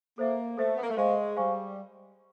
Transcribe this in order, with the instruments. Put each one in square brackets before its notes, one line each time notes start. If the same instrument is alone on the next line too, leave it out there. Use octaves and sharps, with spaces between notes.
[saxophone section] A#3 [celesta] A4 C5 E5
[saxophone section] A3 [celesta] A4 C5 E5
[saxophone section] B3
A#3
A3
[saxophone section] G#3 [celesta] C5 F5 G#5 C#6
[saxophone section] G3 [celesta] C5 F5 G#5 C#6